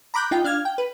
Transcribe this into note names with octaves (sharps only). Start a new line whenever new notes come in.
A#5 B5 D6 F#6 G6
D#4 F4 G5
D4 F5 F6 G#6
G5
B4